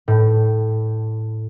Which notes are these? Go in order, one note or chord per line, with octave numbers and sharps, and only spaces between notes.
A2